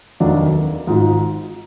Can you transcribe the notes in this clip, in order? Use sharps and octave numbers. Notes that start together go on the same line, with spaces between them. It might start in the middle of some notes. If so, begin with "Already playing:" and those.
F1 D#2 D#3 F#3 D4
G#1 G#2 F3